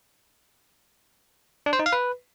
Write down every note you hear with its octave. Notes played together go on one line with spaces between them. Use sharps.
D4
C5
D#4
F5
B4